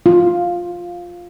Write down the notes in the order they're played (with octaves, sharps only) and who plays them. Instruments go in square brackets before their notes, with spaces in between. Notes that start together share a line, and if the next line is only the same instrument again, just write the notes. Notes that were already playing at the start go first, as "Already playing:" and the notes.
[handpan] F4